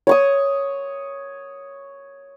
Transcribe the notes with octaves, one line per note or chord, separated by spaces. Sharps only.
C#5 C#6 D#6